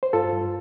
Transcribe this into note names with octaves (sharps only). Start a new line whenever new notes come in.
C5
G2 F4 A4
G2